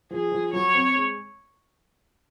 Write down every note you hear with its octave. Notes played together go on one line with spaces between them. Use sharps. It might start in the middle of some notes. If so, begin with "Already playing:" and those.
F3 G#4
F3
F#3 C#5
C4
G#3